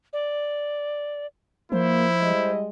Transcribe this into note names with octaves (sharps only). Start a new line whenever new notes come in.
D5
F3 A#3 E4 C5
G3 G#3 D#5